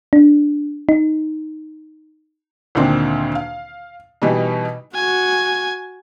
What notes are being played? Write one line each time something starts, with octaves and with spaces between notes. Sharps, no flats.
D4
D#4
D2 A#2 D#3 C4 D4
F5
B2 E3 G3 D#4
F#4 G#5